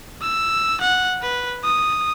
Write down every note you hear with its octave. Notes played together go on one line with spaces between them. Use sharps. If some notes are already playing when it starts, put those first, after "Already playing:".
E6
F#5
B4
D#6